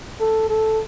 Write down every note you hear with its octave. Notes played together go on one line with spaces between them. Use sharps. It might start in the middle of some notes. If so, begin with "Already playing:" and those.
A4
A4